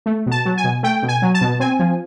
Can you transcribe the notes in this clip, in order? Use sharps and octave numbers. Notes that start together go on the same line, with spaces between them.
A3
B2
A5
F#3
G#5
B2
A3 G5
B2
G#5
F#3
A5
B2
C4 G#5
F3